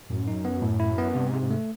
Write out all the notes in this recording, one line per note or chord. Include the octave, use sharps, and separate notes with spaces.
F#2 A2
D#4
B3
A2
E4
B3
G2 C3
G#2
C3
G#2
A3